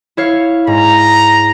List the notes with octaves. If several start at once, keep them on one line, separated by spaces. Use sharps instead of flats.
E4 C#5 F5
G#2 A#5